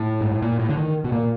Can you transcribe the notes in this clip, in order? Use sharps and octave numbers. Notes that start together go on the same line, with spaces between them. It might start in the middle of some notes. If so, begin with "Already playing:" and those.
Already playing: A2
G#2
A2
A#2
A2
D3
D#3
B2
A#2